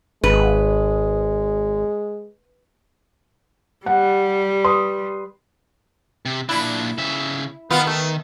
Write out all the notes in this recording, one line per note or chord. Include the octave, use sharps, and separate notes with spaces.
G#1 G#3 B4
G3 F#5
B4 C6 D#6
C3
A#2 D4 E4
C#3 E5
D#3 B3 F4
A3